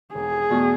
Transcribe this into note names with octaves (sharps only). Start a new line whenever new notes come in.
E1 G#4
E2 B2 A3